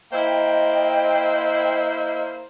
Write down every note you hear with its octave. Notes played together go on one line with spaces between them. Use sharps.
A#3 E4 C5 D#5 G5